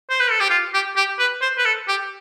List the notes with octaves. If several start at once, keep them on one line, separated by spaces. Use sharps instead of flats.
C5
B4
A4
G4
F4
G4
G4
B4
C5
B4
A4
G4